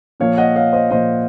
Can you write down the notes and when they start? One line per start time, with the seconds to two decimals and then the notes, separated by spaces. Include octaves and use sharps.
0.20 A#2 F3 A#3 C#5 F5
0.37 D#5 F#5
0.56 C#5 F5
0.73 C5 D#5
0.91 A#2 F3 A#3 C5 D#5